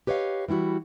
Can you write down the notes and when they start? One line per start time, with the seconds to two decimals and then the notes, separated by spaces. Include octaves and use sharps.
0.07 G4 B4 C#5 D#5 F5
0.48 E3 G3 E4 F#4